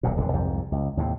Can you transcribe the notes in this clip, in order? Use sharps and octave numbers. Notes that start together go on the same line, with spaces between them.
D#1 B1 F2 A#2
D#1 D3
C2 F2 G#2
C#2
D#2 A2 C3